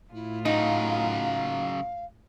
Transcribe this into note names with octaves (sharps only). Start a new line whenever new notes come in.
A2 E4 F4
C#3 F#3 D#4 F5